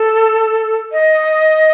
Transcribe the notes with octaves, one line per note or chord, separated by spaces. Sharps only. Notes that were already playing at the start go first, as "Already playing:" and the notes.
Already playing: A4
D#5